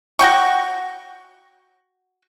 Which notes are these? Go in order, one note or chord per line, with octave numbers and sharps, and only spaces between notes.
F#4 F#5 G5 C#6